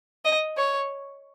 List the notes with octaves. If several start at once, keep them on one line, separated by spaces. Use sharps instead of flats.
D#5
C#5